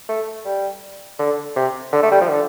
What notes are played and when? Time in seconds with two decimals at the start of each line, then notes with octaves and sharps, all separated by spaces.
0.09 A3
0.45 G3
1.19 D3
1.56 C3
1.93 D3
2.03 A3
2.11 G3
2.21 F3
2.29 D3